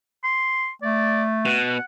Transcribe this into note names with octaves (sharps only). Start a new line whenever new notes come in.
C6
A3 D5
B2 F#5